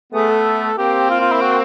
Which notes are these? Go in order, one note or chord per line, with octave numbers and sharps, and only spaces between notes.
A3 B3 G#4
A4
A#3 C4 G4
F4
F4
E4
F#4